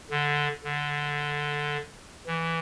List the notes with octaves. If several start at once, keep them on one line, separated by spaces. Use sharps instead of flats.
D3
D3
E3